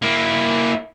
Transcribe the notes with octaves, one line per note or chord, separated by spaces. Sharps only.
A#3 E4